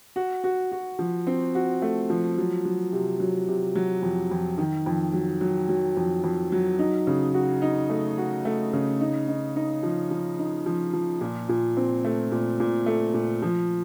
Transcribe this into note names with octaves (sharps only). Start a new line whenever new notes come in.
F#4
F#4
F#4
F3
C4
F#4
A3
F3
F#3
F#3
C3
F#3
C3
F#3
F2
F2
D#3
F2
F#3
F#3
F#3
F2
F2
F#3
D#4
C#3
F#4
D#4
A3
F#4
A3
C#3
D#4
D#4
D#4
F3
F3
D#4
F3
F3
A#2
A#2
C4
A3
A#2
A#2
A3
A#2
F3